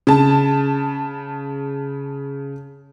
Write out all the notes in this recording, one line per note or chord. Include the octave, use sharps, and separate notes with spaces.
C#3 A5